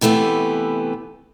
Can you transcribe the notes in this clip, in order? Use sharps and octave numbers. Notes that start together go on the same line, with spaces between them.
C3 E3 A3 B3 G4